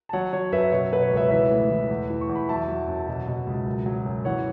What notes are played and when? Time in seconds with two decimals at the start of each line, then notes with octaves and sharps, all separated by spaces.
0.09 A5
0.13 F#3 C#5 F#5
0.33 F#3 C#5
0.52 F#2 B4 E5
0.72 B2 C#5
0.92 B2 B4
1.02 C#5
1.11 C#2
1.16 B4 E5
1.31 E3 B4 E5
1.51 A2
1.70 E3
1.90 E2
2.10 E3
2.21 C#6
2.29 E2
2.35 B5
2.49 F#3 E5 A5
2.68 F#3
2.88 F#2
3.08 B2
3.27 B2
3.47 C#2
3.66 F#2
3.86 F#3
4.06 F#2
4.25 E3 C#5 F#5